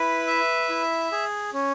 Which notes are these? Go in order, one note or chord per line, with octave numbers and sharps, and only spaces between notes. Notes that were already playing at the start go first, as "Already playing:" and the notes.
Already playing: E4 B4
E5
E4
G#4
C#4